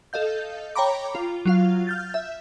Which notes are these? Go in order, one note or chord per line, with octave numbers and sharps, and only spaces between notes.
A4 D#5 F5 G6
C#5 G5 A#5 B5 D6
F4
F#3 F4 F5
F6 G6 A6
E5